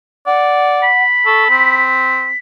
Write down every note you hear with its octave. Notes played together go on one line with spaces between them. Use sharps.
D5 F#5
B5
A4 C#6
C4 B6